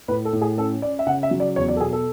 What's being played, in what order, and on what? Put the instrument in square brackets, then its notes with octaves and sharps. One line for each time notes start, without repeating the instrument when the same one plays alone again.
[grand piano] A2 B4
A4
A2
G#4
C#4 A4
C#4 D5
E5
C#3 F#5
E5
F#3
D5
E2 C#5
D5
A4
B2 G#4
A4